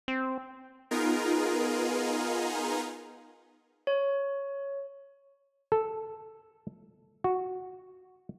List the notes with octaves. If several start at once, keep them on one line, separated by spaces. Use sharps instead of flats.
C4
B3 D#4 F4 G#4 A#4
C#5
A4
F#4